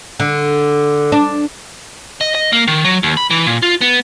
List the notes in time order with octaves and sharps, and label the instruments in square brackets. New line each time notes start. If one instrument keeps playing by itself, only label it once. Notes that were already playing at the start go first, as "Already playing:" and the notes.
[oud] D3
D4
[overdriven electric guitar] D#5
D#5
A#3
D#3
F#3
D#2
B5
E3
A#2
F4
B3